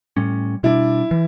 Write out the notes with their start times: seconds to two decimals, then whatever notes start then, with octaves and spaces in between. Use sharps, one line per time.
0.17 A2 G3 C#4
0.63 B2 G3 D4 E4
1.11 E3